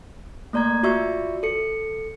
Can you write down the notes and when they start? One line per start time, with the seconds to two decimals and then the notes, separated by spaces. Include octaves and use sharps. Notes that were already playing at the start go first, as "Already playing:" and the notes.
0.53 A3 A#3 D5 A#5 G#6
0.83 F4 F#4 D5 E5 C#6 E6
1.43 A4 C#7